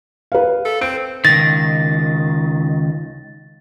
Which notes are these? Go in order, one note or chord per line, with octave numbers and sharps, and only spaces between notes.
B4 F5
A4
C4 D7
C#2 D#3 A6 A#6